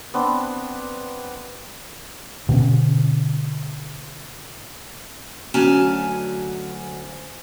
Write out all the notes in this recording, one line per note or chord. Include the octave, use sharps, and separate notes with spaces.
B3 C4 D4
B2 D3 B3 C#4
D2 F#3 C#4 G#5 A5